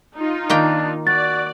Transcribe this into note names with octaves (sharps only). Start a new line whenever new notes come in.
D#4 F4
D#3 A#3 D4 G5
F#4 D5 A6